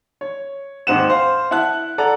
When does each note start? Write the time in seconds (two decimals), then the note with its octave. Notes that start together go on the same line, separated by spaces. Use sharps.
0.21 C#5
0.87 D#2 G#2 C4 F#5 E7
1.10 C5 F5
1.51 E4 F#5 A5 F#6
1.98 A4 D5 F#5 A#5